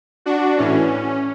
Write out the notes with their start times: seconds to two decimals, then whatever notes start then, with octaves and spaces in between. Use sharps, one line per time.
0.26 D4 F#4
0.58 A2 E3 C#4